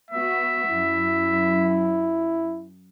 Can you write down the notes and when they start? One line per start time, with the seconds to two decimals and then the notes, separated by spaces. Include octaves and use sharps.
0.11 B3 F#4 E5
0.68 F#2 E4